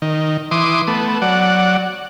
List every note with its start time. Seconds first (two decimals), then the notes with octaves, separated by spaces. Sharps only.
0.02 D#3
0.51 E3 C6 D6 D#6
0.88 A3 B3
1.22 F#3 D5 F#5